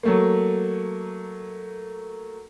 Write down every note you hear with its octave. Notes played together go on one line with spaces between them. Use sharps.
F#3 A3 A#3